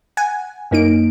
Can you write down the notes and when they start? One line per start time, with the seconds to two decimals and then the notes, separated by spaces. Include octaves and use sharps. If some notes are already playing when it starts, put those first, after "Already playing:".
0.17 F#5 G#5
0.71 F#2 A#3 D#4 D7